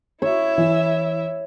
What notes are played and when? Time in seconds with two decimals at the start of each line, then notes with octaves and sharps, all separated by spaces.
0.22 E4 C#5 E5
0.58 E3